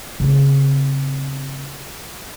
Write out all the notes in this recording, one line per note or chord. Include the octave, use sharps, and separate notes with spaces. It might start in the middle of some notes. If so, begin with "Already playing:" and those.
C#3 C4